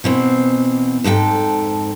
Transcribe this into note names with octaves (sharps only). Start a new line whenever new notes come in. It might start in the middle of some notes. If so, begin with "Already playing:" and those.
B2 E3 C4
F2 G#2 A4 G5